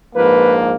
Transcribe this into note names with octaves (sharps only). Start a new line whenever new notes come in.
A#1 G#2 F3 A#3 B4